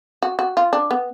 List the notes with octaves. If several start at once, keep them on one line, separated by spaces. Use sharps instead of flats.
F#4
F#4
F4
D4
B3